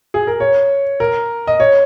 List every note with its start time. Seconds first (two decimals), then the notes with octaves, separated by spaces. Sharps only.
0.14 G#4
0.27 A#4
0.40 C#5
1.00 A#4
1.47 D#5
1.60 C#5